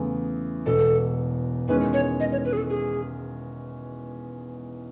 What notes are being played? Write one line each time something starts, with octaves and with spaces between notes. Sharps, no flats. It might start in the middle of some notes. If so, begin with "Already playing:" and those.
Already playing: E2 C#3 E3 A3
E1 E2 B2 A4
E1 E2 D#3 G#3 C#4 B4
C#5
D#5
C#5
B4
G#4
A4
G#4